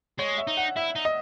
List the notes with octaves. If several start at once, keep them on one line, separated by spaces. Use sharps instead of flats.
G#3 C#5
E5
D#4
F#5
E4 E5
D#4
D#5